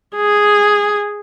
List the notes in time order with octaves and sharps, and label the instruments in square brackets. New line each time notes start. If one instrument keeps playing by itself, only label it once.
[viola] G#4